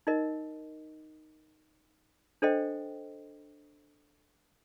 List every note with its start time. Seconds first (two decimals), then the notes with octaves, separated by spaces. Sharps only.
0.07 D#4 A#4 D#5
2.42 D4 A4 C5 D#5 G5